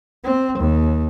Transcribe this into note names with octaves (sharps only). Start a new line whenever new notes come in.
C4
D#2